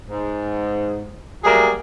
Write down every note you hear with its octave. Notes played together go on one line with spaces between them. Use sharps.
G#2
F#3 G3 A3 A#3 G#4